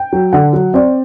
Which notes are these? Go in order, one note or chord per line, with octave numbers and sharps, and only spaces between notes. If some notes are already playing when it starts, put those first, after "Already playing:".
Already playing: G5
F#3
D3 F#5
F#3
C4 D5